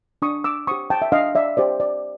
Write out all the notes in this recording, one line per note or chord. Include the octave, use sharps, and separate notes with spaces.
D4 C#6 D#6
D6 E6
G4 C5 C#6 D#6
G5 A5
E5
D4 D#5 F5
D5 E5
G4 C5 D5
D5